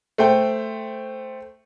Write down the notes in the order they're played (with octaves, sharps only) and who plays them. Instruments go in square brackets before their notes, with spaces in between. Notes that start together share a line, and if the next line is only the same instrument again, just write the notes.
[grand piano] A3 C5 G5